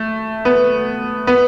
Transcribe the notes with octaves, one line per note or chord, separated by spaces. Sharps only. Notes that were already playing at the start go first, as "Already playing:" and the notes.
Already playing: A3
B3
B3